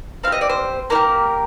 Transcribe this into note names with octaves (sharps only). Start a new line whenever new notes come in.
C4 G4 F5
D#5
D5
C5
A#3 D#4 G4 A#4